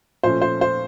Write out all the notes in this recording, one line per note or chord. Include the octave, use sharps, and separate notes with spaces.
A#2 F3 A3 C#4 C5
C5
C5